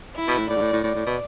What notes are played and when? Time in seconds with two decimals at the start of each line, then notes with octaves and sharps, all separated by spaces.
0.16 E4
0.28 B2
0.38 A2
0.50 A2 D5
0.56 G#2
0.61 A2
0.73 A2
0.84 A2 D5
0.95 A2
1.06 B2